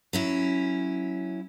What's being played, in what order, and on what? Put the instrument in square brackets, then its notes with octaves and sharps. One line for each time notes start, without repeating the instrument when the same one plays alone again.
[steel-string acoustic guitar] F#3 C#4 E4